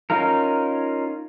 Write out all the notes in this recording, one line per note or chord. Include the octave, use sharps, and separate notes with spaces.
C#4 D#4 F4 A#4